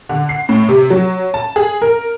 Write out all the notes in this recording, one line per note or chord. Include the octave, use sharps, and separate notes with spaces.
D3
C7
A2
C3
F#3
A5
G#4
A#4